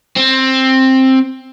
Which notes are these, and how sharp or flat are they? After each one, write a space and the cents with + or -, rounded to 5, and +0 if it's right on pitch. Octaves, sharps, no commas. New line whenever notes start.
C4 +10